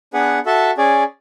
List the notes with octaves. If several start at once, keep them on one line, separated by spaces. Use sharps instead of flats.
B3 D4 G#4 B4 F#5
F#4 A4 E5 A5
C#4 G#4 D5